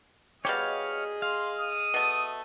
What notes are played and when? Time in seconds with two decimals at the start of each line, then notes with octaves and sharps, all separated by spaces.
0.45 B2 G3 G4 G#4 C#5 D#5 F5
1.22 F5 C6
1.58 D#6
1.94 B2 A3